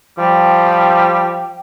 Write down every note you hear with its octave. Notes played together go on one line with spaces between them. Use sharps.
F3 G3 G5